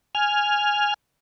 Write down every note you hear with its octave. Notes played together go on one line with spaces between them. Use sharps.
G#5 F6